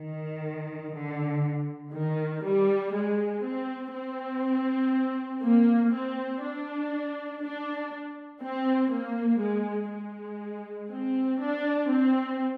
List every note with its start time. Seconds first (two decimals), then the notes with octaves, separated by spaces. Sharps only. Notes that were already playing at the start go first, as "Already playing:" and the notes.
Already playing: D#3
0.95 D3
1.93 D#3
2.44 G3
2.93 G#3
3.44 C4
3.93 C4
5.42 A#3
5.92 C4
6.42 D4
7.42 D4
8.42 C4
8.91 A#3
9.40 G#3
9.91 G#3
10.90 C4
11.41 D4
11.90 C4